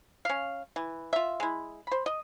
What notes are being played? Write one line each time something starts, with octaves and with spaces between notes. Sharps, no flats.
C#4 F5
E3
F4 E5
G#3 E4
C5 B5
D#5